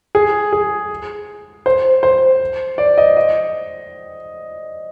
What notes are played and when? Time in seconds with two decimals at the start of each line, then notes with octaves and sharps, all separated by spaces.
0.15 G#4
0.53 G#4
1.66 C5
2.03 C5
2.78 D5
2.98 D#5
3.17 D#5